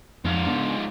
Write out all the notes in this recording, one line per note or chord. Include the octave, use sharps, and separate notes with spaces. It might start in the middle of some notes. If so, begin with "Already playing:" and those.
F2 G#2 F3 F4
C#3 B3 D4